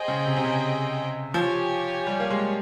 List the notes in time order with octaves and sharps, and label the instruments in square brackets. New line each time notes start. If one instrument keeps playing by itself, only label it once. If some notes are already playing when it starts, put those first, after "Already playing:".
Already playing: [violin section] G#4 C5 D#5 G5
[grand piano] C#3
C3
C3
C#3
[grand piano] F3 [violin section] G4 C#5 G#5
[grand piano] G3
A#3
G#3